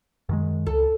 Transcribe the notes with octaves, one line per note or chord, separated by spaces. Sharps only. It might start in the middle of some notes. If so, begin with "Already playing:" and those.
F#2 D#3 G#3
C#2 A4